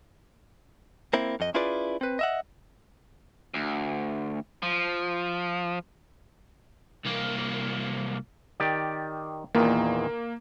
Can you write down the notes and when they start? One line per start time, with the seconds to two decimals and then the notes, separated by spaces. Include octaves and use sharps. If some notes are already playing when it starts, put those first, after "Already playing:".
1.13 A#3 C4 E4
1.40 F2 D#5
1.54 C#4 E4 F4 G#4 B4 D5
2.01 C4 B4
2.19 D#5 E5 F#5
3.54 D2
4.63 F3
7.05 C2 A#3
8.60 D#3 G4 D5
9.55 E2 A#2 D#3 A#3